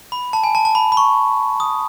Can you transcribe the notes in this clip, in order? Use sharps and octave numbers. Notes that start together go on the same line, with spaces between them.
B5
A5
G#5
A5
A5
B5
B5
C#6
D#6